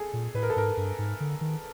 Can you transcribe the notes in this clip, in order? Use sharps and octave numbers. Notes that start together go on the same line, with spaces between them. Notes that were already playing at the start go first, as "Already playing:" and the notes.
Already playing: G#4 A4
A#2
A2 B4
A#4
A4
G#2 A#4
G2
G#2
D3
D#3